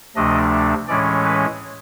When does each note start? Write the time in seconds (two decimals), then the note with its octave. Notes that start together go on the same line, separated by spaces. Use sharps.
0.16 D2 C3 F3 A3 D4 D#5
0.87 A2 E3 G#3 C#4 D5
1.25 B4